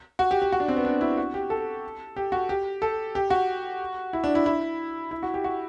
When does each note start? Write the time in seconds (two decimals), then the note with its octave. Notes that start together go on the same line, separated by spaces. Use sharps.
0.19 F#4
0.31 G4
0.42 G4
0.52 F#4
0.60 D4
0.68 C4
0.76 B3
0.85 D4
1.01 E4
1.18 F#4
1.34 G4
1.50 A4
2.16 G4
2.32 F#4
2.49 G4
2.82 A4
3.15 G4
3.30 F#4
4.13 E4
4.24 D4
4.35 E4
4.46 E4
5.11 E4
5.23 F#4
5.34 G4
5.44 F#4